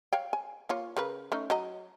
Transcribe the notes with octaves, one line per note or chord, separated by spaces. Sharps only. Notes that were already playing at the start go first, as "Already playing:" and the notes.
C#5 F5 G5
G#5
A#3 F4 C#5
C#3 A#4 B4
A3 C#4 D#4
F#3 D#5 A#5